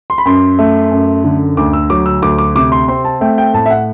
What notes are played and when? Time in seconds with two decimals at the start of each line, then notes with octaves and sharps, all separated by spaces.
0.10 C6
0.18 B5
0.25 F#2 C6
0.59 A3
0.92 F#2
1.24 D3
1.57 D2 D6
1.73 E6
1.90 F#3 D6
2.06 E6
2.22 D2 D6
2.38 D6
2.55 C3 D6
2.72 C6
2.88 C4 C6
3.05 A5
3.21 A3 G5
3.38 G5
3.54 A2 A5
3.66 E5
3.70 F#5